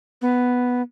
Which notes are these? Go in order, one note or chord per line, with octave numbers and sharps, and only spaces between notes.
B3